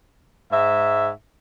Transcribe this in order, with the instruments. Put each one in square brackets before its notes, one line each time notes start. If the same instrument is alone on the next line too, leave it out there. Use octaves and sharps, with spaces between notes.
[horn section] G#2 E5